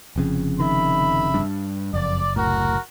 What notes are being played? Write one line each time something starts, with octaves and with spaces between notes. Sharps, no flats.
F1 F2 C#3
D#3 E5 B5
G2 G3 D4
F#1 F2 D5
C2 A2 F#4 A#4